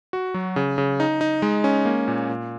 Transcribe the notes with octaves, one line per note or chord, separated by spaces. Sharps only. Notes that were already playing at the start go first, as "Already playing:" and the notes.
F#4
F#3
C#3
C#3
D#4
D#4
G#3
C#4
A#3
A#2
A#2